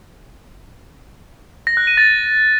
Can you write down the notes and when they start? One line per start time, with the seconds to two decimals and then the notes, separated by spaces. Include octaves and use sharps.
1.67 A#6
1.77 F#6
1.87 D#7
1.97 A6